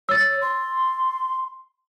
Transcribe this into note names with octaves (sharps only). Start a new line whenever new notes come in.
C#5 E6 A6
C6